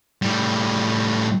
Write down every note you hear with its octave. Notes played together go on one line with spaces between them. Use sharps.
A2 G3